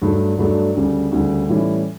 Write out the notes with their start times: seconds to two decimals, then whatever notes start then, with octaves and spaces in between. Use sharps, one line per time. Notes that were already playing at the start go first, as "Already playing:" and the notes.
0.02 G2 F#3 A3 D4
0.38 G2 F#3 A3 D4
0.75 D2 C#3 G3
1.12 D2 C#3 G3
1.49 A2 E3 G3 C#4 E4